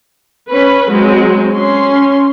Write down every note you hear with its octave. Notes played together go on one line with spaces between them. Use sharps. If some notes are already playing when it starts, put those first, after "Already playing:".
C#4 B4 B5
F#3 G#3 C4
C#4 C6